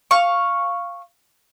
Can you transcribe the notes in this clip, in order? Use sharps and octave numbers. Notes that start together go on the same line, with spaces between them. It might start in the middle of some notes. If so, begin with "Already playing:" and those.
F5 C#6